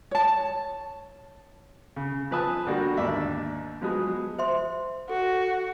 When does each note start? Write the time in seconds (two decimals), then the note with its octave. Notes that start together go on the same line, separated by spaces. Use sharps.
0.11 C#5 A5
1.96 C#3
2.31 F3 F4 B4 G#5 A5 D#6
2.67 D3 G3 A#3 D4 F#4
2.97 D#2 G#2 D4 D5 E5
3.82 F3 F#3 G#3 B3 G#4
4.38 C5 E5 C6
5.09 F#4 A4